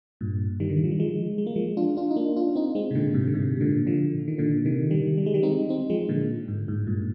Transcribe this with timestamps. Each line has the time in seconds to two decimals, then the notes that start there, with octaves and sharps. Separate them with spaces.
0.21 G2 A#2
0.60 D#3 G3
0.70 D3
0.77 D#3
0.84 F3
0.91 G3
0.99 F3 G#3
1.38 G#3
1.46 A#3
1.56 F3 G#3
1.77 D4 F4
1.97 D4 F4
2.11 D#4
2.16 A#3 D4
2.36 D4 F4
2.55 C4 D#4
2.75 G#3 C4
2.91 C3
2.95 A#2 D3
3.14 G#2 C3
3.27 D3
3.34 G#2 C3
3.56 C3
3.61 A#2 D3
3.87 D3 F3
4.28 D#3
4.38 A#2 D3
4.65 C3 D#3
4.91 D#3 G3
5.18 G3
5.26 G#3
5.34 D#3 G3
5.43 C4 D#4
5.69 C4 D#4
5.90 F3 G#3
6.09 A#2 D3
6.48 G#2
6.68 G#2
6.87 G2 A#2